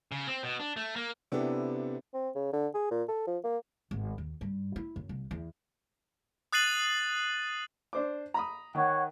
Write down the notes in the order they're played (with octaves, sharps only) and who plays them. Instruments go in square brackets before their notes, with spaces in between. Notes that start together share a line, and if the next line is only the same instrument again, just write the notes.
[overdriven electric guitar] C#3
C4
B2
D4
A3
A#3
[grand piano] C3 B3 D4 E4 G4 A4
[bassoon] C4
C#3
D3
G#4
A#2
A4
F3
A#3
[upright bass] G#1
D#2
G2
E4
F#2
C2
E2
[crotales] D#6 F#6 A6 C7 D#7 F#7
[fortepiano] D4 C5 D6
A#5 B5 D#6
[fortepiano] D#3 [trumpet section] C#5 F#5